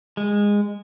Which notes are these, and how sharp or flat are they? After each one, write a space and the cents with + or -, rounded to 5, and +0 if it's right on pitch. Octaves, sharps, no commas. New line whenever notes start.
G#3 -15